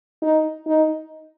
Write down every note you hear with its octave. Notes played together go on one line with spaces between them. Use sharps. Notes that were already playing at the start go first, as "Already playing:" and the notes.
D#4
D#4